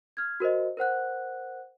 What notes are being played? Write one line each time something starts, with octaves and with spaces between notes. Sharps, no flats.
F6 G#6
F#4 A#4 C5 D#5
A#4 C5 F#5 F#6